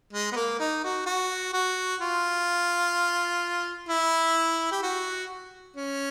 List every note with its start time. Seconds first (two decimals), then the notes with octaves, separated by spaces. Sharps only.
0.13 G#3
0.32 B3
0.36 A#3
0.59 D#4
0.84 F#4
1.06 F#4
1.53 F#4
2.01 F4
3.89 E4
4.72 G4
4.83 F#4
5.76 C#4